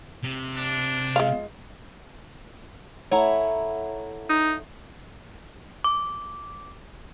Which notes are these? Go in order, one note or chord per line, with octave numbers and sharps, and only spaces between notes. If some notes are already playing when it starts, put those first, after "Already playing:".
C3
D4
G#3 F4 F5
A3 E4 C#5 F#5 A#5
D#4
D6